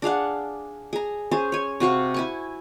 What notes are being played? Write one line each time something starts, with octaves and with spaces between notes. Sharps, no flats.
D4 G#4 F5 F#5
G#4 A#5
C#4 G#4 C5
C#5 G#5
C3 F#4 F5 C#6
E4 G#5 C#6